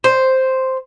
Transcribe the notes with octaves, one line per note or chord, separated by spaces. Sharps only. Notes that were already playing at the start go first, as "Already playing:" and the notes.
C5